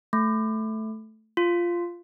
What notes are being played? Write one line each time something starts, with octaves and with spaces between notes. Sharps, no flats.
A3
F4